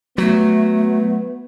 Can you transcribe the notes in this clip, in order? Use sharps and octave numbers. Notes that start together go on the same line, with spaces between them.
F#3 A3 B3